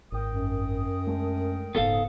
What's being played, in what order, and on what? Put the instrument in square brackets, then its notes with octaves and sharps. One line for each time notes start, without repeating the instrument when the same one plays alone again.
[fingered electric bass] G#1 [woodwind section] A#4 G5 D#6
[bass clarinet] F#2
[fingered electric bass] G#3 A3 D4
[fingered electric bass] E1 A#1 C#3 [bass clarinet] G#2 [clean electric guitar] B3 A4 F5